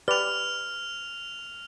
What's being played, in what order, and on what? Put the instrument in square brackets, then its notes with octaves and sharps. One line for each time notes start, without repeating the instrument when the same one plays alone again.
[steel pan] G4 B4 D5 [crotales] F6 F7